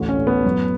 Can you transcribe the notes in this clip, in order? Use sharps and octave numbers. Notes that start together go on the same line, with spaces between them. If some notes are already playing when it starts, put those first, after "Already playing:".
Already playing: A1 D2
C#4
A2
B3
F#2